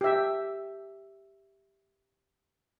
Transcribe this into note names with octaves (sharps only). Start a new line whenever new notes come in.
G4 E5